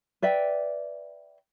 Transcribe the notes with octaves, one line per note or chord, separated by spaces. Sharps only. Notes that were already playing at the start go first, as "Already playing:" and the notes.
B4 D5 E5 G5